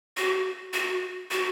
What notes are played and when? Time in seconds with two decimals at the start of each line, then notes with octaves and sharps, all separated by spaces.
0.17 F#4
0.73 F#4
1.31 F#4